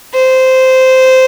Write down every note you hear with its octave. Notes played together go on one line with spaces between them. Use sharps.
C5